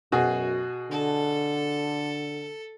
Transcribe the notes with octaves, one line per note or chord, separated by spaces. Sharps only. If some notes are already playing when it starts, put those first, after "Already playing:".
F#2 B2 F#4 G#4
D3 A4